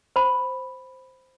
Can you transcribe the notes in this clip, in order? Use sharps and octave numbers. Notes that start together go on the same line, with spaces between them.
C5 B5